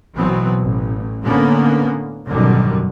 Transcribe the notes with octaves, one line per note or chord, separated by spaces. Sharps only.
A1 B2 E3 F#3 B3 C4
A1
A2 D3 A#3 B3 C#4
G#1 F#2 B2 D3 D#3 G3